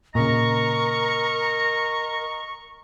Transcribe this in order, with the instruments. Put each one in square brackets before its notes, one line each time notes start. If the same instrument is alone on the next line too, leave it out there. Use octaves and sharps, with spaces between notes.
[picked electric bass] A#2 C#3 [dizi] A#4 [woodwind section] D#5 A#5 [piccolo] C#6